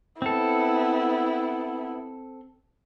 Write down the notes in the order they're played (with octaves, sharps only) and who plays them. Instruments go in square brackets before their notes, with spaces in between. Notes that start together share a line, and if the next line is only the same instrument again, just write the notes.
[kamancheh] B3 E4 [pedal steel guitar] C4 A4